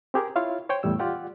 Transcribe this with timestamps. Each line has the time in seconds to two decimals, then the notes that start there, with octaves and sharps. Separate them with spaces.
0.14 C4 G4 G#4 A#4
0.36 E4 F4 C#5 F5
0.69 C5 C#5 G5
0.83 E2 A2 G3 E6
0.99 F4 G4 D5 F#5